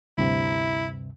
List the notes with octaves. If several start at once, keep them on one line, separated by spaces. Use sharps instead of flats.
D2 G2 C3 E4